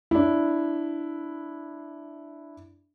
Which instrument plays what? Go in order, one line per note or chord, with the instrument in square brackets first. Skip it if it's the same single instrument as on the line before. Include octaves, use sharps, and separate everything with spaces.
[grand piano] D4 E4